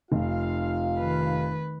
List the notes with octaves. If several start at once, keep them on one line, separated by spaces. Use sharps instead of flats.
F1 F4 F5
D#3 B4